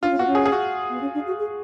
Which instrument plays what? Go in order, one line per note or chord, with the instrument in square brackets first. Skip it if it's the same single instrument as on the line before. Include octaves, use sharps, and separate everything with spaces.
[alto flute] D4 [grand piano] F4
[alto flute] C#4
[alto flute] B3 [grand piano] F#4
[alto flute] C#4
[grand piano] G#4
G#4
F#4
[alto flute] B3
C#4
D4
F#4
G#4